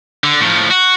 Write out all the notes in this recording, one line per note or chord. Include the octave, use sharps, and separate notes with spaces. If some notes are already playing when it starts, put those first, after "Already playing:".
D3
A2 F3
F#4